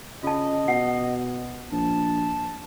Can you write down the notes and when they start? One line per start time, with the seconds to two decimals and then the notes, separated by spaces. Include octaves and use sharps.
0.23 C#3 F4 D#5 A5
0.68 B2 F#5
1.72 A#1 A5